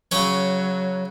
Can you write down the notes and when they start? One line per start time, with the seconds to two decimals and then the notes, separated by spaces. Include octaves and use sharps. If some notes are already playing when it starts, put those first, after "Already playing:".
0.11 C#3 F#3 C#4 C#5